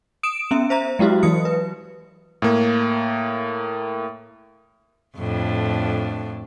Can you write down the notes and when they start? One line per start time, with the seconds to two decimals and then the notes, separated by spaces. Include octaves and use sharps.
0.23 D#6 D7 E7
0.51 B3 C#4 E5
0.70 C5 E5 A#5
0.99 F#3 G#3 E4 F#4 G4
1.23 E3 F#3 D#6 C#7
1.45 B4
2.42 A2 A#3
5.17 F2 A2 D4